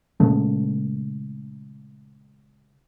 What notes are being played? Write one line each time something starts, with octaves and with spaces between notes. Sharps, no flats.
A#2 C#3 G#3 A3